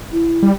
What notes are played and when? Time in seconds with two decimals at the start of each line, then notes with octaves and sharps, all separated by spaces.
0.12 E4
0.43 G3